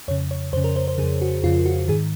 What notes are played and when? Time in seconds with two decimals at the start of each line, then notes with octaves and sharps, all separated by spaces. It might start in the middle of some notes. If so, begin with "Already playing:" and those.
0.08 F2 C#5
0.11 C#3
0.31 C#5
0.53 F2 C5
0.57 C#3
0.64 A#4
0.76 C5
0.88 C5
0.98 C#3 G#4
1.02 F2
1.21 F#4
1.43 F2 C#3 F4
1.66 F#4
1.88 G#2 D#3 G#4